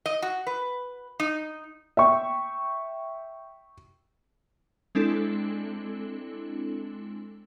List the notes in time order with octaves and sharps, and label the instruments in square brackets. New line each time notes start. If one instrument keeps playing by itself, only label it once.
[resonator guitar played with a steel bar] D#5
F#4
B4
D#4
[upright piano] E5 G5 C#6
[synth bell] G#3 C4 D4 E4 A4